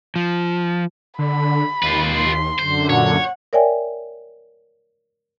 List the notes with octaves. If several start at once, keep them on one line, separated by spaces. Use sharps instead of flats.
F3
D3 B5
D#2 F4 B4
C6
F#2 D3 C5
A#2 C#5 F#5
A#4 C#5 D5 E5 G5 G#5